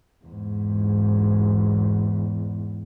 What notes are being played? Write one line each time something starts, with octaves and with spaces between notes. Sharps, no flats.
E2 G#2